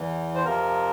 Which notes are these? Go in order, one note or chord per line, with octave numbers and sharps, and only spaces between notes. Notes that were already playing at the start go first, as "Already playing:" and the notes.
Already playing: E2 E3
C5
F2 C3 F3 A#4